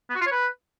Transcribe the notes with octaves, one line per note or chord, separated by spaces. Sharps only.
B3
F#4
F4
C#5
B4